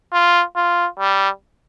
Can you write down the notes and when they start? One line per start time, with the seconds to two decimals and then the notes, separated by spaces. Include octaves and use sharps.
0.13 F4
0.56 F4
0.99 G3